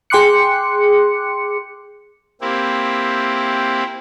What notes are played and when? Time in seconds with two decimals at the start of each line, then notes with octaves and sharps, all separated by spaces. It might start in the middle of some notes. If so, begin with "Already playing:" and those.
0.10 G#4 G5 C6 D6 F#6 C#7
2.41 A#3 C4 E4 G4